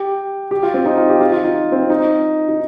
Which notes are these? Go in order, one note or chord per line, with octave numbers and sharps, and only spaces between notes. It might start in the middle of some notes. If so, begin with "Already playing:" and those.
Already playing: G4
G4
F4
C4
D#4
F4
G4
F4
F4
D#4
C4
D#4
D#4